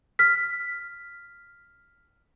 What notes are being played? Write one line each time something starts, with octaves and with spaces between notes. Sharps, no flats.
F6 B6